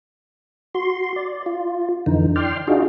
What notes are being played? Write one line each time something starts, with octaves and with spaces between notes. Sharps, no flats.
F#4 C6
D5
F4
F2 D3 E3 D#4
D5 G5 C6 F6
D4 D#4 F4 F#4 G#4